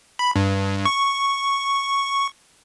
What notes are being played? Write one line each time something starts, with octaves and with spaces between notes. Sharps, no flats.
B5
G2
C#6